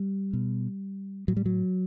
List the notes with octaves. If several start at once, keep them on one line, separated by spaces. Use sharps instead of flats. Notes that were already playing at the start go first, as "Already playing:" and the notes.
Already playing: G3
B2
A2 F#3
G3
F#3